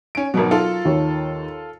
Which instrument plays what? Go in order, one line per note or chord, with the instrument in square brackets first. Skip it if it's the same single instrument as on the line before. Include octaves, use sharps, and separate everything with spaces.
[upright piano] C#4 D7
[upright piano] G#1 B2 [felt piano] F#3 A#4
[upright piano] F4 A4
[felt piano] D#2 C#5